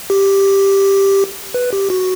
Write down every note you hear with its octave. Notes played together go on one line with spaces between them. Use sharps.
G4
B4
G4
F#4